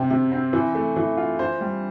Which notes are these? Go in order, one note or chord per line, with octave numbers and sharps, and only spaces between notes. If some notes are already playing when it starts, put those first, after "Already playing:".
Already playing: C3 G4
C3
C4
E3
A3
E3
F4
C5
G3